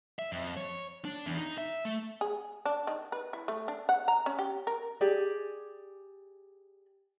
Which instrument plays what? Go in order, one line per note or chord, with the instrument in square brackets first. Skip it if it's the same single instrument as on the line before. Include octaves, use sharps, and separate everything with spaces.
[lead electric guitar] E5
F2
C#5
D4
E2
D#4
E5
A3
[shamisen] G#4
D4
D#3
B4
E4
A3
D4
F#5
A#5
C#4
G4
A#4
[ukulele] G4 G#4 D5